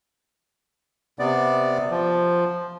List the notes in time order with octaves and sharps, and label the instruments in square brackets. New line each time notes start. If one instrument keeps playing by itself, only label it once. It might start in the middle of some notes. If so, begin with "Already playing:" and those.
[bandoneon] C3 B3 D5
F3